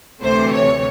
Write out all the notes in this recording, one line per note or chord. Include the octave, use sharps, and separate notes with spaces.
D2 C3 E3 A3 C5
C#5